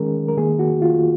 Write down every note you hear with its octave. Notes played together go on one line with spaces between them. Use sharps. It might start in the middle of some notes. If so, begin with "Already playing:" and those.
Already playing: D#3 G#3 C#4 G#4 A#4
A#4
D#3 A#3 G#4
F#4
F4